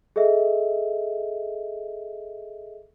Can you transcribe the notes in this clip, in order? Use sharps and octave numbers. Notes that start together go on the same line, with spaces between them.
G#4 A4 D#5 E5